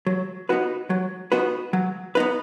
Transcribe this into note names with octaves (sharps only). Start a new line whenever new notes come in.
F#3
B3 D#4 F#4 B4
F#3
B3 D#4 F#4 B4
F#3
B3 D#4 B4